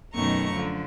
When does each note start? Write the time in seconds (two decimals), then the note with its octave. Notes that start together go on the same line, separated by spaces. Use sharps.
0.14 F#2 B2 D#3 A3 A#5 C#6
0.53 D3 F3